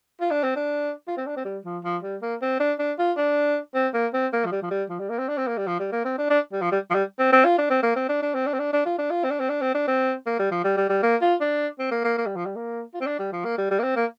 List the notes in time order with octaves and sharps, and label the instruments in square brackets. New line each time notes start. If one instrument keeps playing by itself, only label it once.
[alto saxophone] F4
D4
C4
D4
F4
C4
D4
C4
G3
F3
F3
G3
A#3
C4
D4
D4
F4
D4
C4
A#3
C4
A#3
F3
G3
F3
G3
F3
G3
A#3
C4
D4
C4
A#3
G3
F3
G3
A#3
C4
D4
D4
G3
F3
G3
F3
G3
C4
C4
F4
D4
C4
A#3
C4
D4
D4
C4
D4
C4
D4
D4
F4
D4
F4
C4
D4
C4
D4
C4
D4
C4
A#3
G3
F3
G3
G3
G3
A#3
F4
D4
C4
A#3
A#3
A#3
G3
F3
G3
A#3
F4
C4
D4
G3
F3
A#3
G3
G3
A#3
C4
A#3